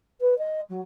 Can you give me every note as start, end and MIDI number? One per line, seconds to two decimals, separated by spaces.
0.20 0.37 71
0.38 0.60 75
0.69 0.81 54